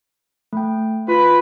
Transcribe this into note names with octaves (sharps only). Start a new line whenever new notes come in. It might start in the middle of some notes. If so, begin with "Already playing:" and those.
A3 G5
F4 B4